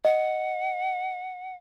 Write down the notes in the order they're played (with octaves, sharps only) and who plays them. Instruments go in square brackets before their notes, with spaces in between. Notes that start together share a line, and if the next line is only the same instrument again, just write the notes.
[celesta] D#5 [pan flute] F#5